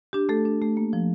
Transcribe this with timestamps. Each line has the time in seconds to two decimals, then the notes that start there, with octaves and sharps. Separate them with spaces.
0.13 D4 G4
0.29 A3 A4
0.45 D4
0.62 A3
0.77 A#3
0.93 F3